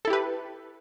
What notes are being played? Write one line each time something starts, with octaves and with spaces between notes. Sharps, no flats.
E4 G4 A4 B4